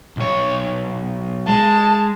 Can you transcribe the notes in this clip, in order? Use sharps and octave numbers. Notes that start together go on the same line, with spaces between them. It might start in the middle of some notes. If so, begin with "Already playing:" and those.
B1 C#5
G#3 A5